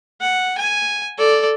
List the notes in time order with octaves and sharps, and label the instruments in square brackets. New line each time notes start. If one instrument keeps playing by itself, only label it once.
[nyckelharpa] F#5
G#5
A4 D5